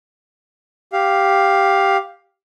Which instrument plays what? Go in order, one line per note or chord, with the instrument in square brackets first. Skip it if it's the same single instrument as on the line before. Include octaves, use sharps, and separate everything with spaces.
[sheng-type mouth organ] G4 F5